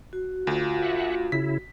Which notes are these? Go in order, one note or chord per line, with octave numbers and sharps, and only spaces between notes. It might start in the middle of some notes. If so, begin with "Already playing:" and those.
F#4
D2 F4
E5 F#5
C#3 E4 B6